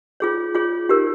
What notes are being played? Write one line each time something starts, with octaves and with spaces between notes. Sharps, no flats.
F4 G#4 C#5
F4 G#4 C#5
D#4 G4 A#4